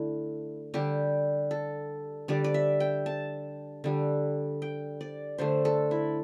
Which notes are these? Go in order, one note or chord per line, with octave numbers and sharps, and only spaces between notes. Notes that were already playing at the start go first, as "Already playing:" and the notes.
Already playing: D3 A3 E4
D3 G3 G4
A4
D3 G3 D5
D5
E5
G5
A5
D3 G3
G5
D5
D3 A3 C5
A4
E4